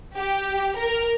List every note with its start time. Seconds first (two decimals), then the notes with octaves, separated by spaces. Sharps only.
0.16 G4
0.76 A#4